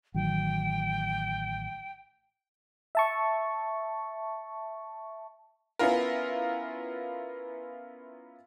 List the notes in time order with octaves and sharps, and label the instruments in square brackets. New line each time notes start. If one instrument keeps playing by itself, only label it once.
[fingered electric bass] A1 D#3 F#3 [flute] G5
[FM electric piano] E5 A5 C#6
[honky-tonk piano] B3 C#4 E4 F4 A#4